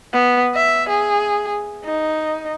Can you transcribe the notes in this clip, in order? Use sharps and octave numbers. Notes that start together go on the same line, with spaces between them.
B3
E5
G#4
D#4